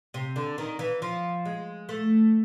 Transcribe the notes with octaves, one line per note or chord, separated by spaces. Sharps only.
C3
D3
D#3
E3
F3
G#3
A3